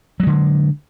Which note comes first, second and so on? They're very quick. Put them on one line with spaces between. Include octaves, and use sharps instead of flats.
F#3 G#3 D3